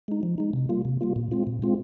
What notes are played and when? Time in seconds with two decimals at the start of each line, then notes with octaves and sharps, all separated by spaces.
0.08 G#3 D#4
0.23 F3
0.38 G#3 D#4
0.53 C3
0.69 G3 A#3 F4
0.85 C3
1.01 G3 A#3 F4
1.16 A#2
1.31 G#3 C4 F4
1.47 A#2
1.62 G#3 C4 F4